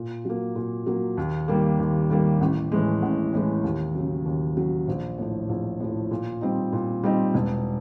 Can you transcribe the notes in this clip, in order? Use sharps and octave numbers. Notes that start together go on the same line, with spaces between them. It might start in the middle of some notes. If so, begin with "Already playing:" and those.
Already playing: A#2
F#3 A#3
A#2
F#3 A#3
D#2
D#3 G3 A#3
D#2
D#3 G3 A#3
A1
A2 E3 G#3
A1
A2 E3 G#3
D#2
C#3 F#3
D#2
C#3 F#3
A#1
A2 F3
A#1
A2 F3
A#2
G3 C4 D#4
A#2
G3 C4 D#4
E1